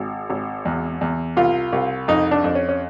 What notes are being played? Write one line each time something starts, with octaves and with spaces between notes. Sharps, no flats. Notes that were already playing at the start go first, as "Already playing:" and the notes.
Already playing: G#1
G#1
E2
E2
C2 F4
C2
F2 D#4
D4
F2
C#4
C#4